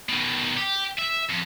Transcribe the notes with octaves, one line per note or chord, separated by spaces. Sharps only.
B2 D#3
G4
E5
F2